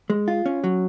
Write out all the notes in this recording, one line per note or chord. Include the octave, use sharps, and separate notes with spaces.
G#3
F4
C#4
F#3